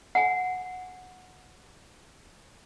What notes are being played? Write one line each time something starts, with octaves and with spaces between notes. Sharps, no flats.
F#5 G#5